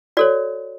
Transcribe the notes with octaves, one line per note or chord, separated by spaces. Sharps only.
F#4 A4 C#5 D5